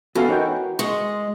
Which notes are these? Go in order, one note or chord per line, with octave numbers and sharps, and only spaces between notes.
E3 B3 C#4 F#4 A4 F5
D#4 F#4 A#4 C#5 G5
G#3 D#5 C6 C#6